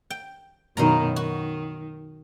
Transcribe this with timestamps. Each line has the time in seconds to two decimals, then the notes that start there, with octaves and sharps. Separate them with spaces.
0.10 G5
0.77 F#2 B2 D#3 D#5 F5 A#5
1.16 D#3 F#4